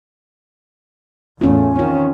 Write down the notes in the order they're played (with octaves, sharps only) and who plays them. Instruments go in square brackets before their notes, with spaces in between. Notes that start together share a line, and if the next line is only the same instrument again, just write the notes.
[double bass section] E2 A2 A3 [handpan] C#4 F4
[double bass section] D#3 C#4 [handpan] C4 F4